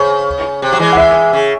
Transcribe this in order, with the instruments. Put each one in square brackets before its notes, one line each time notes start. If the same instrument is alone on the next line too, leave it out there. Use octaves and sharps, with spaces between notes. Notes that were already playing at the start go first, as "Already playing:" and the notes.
Already playing: [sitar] C#3 [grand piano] C5 C#5
[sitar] C3
F#3
E3 G#3
[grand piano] F#5
E5
[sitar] C#3